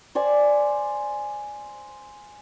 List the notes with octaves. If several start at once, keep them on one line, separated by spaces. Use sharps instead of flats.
C5 D5 G#5